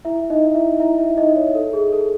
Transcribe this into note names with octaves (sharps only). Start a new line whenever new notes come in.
E4 E5
D#4 D#5
E4 E5
E4 E5
E4 E5
D#4 D#5
C#5
A4
G#4
A4